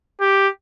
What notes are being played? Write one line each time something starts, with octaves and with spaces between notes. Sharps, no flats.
G4